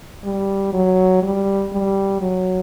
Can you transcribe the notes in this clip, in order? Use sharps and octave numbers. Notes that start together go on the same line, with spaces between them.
G3
F#3
G3
G3
F#3